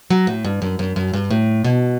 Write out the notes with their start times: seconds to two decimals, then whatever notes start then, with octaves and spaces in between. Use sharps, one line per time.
0.10 F#3
0.27 A2
0.45 G2
0.62 F#2
0.79 F#2
0.96 F#2
1.14 G2
1.31 A2
1.64 B2